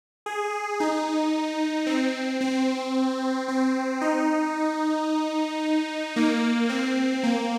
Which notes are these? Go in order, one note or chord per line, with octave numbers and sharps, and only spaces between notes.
G#4
D#4
C4
C4
C4
D#4
A#3
C4
A#3